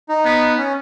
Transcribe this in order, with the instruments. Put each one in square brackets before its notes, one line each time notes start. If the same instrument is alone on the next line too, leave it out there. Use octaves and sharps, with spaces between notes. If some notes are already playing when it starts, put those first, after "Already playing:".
[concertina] D#4
[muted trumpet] B3
[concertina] C#4